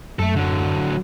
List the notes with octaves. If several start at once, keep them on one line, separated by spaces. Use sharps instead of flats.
F#2 A3 A4
D3 F#3